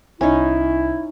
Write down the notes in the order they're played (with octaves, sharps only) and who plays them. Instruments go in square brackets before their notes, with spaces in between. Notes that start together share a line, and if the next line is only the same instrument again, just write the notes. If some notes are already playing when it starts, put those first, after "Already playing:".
[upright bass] C2 [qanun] C#4 D#4 [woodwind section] E4